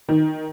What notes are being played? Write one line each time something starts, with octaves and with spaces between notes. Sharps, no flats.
D#3